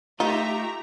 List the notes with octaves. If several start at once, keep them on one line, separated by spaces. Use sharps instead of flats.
A3 D#4 F4 G4 E5 A#5